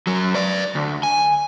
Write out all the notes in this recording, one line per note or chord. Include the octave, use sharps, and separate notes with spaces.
F#2 F#3
B4 D5
D2
G#5